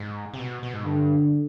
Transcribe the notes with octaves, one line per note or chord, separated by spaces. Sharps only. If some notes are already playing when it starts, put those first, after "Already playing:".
Already playing: G#2
C3
B2
B2
G#2
G2 D3